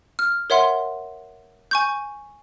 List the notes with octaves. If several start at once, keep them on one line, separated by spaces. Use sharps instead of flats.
F6
A#4 C#5 E5 F#5 C6
G#5 C#6 G6